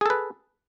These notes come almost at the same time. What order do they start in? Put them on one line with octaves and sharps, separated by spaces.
G#4 A4 B4